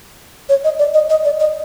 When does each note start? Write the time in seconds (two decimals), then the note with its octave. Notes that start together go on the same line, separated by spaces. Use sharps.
0.49 C#5
0.64 D#5
0.79 D5
0.94 D#5
1.10 D#5
1.25 D5
1.40 D#5